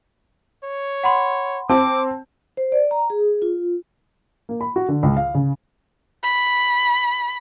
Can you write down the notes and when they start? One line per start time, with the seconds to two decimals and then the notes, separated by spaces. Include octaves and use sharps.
0.63 C#5
1.04 F#5 B5 C6
1.69 C4 A5 D6
2.57 C5
2.72 D5
2.91 A#5
3.10 G#4
3.42 F4
4.49 A#3
4.61 B5
4.76 F#4
4.88 D3
5.03 C#2
5.17 F5
5.35 C#3
6.23 B5